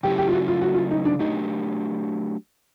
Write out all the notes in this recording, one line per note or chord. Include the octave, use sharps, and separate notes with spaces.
C#3 F#3 A3 C#4 E4 G4
G4
F4
F#4
F4
F#4
F4
D#4
D4
F#3 A3 D4 D#4 G4